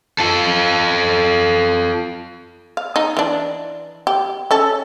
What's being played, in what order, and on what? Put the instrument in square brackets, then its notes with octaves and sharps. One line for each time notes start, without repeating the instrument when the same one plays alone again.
[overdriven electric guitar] F4 A4
[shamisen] F5
D#4
E3 D4
G4
C#4 A4